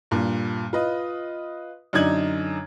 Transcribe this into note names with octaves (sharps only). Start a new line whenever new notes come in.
G2 A#2
F4 B4 D#5
F#2 D3 D4 D#4 G#6 F#7